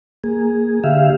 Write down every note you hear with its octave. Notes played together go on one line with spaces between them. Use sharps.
A#3 G#4
D3 G4 E5 F5